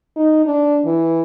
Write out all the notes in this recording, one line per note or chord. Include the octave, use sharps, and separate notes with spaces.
D#4
D4
E3